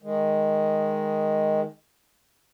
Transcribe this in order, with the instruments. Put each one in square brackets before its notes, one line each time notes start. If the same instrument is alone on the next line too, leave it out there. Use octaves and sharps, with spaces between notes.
[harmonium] D#3 G#3